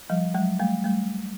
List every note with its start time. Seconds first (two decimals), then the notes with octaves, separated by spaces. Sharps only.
0.10 F3 G3
0.34 F#3 G#3
0.60 G3 A3
0.84 G3 A3